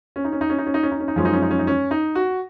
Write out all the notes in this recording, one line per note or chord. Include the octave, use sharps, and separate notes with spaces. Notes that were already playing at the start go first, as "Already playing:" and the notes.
C#4
D#4
C#4
D#4
C#4
D#4
C#4
D#4
C#4
D#4
C#4
D#4
F#2 F3 G#3 C#4
D#4
C#4
D#4
C#4
D#4
C#4
D#4
F#4